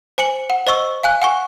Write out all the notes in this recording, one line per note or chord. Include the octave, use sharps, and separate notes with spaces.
C5 G#5 C#7 F#7
F#5
C5 D#5 C#6 E6
F5 G#5 F#6
F#5 G#5 C#6